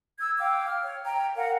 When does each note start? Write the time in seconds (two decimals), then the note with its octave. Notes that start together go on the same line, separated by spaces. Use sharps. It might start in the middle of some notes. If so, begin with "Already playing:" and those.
0.19 E6 G#6
0.38 F5 G5 D6
0.67 F6
0.83 C#5
1.03 G5 A#5
1.36 A#4 F5 F#5